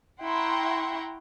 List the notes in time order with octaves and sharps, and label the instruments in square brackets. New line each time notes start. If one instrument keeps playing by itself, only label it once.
[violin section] E4 F#5 G5 A#5 C6 C#6